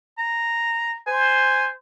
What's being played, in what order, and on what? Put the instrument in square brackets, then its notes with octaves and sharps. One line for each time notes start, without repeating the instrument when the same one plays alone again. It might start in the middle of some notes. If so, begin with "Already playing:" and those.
[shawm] A#5
[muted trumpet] C5 [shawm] G#5